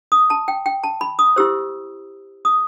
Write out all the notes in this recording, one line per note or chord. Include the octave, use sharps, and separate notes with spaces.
D#6
A5
G5
G5
A5
B5
D#6
E4 G4 C5 E6
D#6